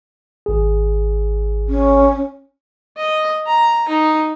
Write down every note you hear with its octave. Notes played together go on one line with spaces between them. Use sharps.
G#1 G#4
C#4
D#5
A#5
D#4